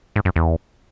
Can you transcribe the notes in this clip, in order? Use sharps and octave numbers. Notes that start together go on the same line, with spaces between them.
G#2
F#2
E2